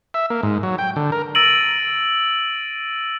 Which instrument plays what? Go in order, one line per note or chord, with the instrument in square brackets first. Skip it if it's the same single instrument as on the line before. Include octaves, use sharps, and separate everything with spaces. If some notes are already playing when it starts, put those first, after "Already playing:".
[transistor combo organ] E5
A#3
G#2
F#3
G5
D3
A#4
[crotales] E6 A6 A#6 D7 D#7 F#7